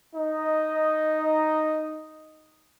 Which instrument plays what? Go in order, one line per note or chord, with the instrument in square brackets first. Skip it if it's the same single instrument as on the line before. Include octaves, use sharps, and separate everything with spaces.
[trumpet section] D#4 D#5